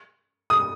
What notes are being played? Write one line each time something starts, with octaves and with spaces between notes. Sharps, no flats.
D#6